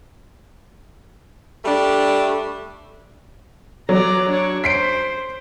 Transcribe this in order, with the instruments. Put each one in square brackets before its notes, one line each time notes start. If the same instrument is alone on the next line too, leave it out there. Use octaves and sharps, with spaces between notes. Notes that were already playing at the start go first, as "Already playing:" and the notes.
[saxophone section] G3 A3 D4
[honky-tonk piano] F#3 [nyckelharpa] D5 A#5
[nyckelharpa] D4 C#5
[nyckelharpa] C5 [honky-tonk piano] B6 C7 D7